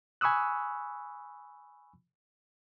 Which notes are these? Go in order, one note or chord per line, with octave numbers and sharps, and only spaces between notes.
G#5 B5 C#6 D#6 E6 F#6